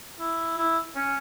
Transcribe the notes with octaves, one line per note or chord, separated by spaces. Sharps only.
E4
E4
C#4